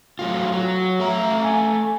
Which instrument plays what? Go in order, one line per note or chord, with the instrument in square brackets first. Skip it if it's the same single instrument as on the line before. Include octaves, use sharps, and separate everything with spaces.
[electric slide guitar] F#3 A3 F4
[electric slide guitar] F#3 [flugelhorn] C#5
[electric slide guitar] A3 A#5 [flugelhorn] E5
[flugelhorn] G#5